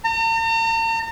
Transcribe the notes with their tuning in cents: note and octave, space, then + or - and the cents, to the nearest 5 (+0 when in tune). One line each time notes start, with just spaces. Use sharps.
A#5 -45